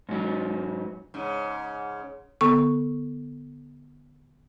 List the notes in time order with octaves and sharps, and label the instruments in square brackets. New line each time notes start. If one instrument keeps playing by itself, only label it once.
[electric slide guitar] G#2 F#3
[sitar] G#2 C#3
[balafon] D3 B3 A4 C#6